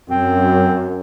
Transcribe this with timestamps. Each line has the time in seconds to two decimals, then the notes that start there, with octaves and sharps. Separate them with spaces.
0.10 F#2 C4